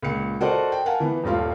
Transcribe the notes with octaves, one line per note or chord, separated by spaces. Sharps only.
C#2 A#2 C#7
F#4 A4 A#4 C5 D5 D#5
G5
A#4 F5 F#5 G#5 A5
E3 B3
D#1 G2 A3 F4 F5